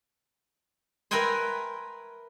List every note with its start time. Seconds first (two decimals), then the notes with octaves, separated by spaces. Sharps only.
1.11 A#4 B4 E5 G5 G#5 C6